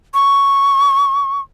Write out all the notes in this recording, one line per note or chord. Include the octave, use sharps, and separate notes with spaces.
C#6